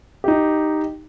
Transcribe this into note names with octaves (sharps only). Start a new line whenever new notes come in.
D#4 G4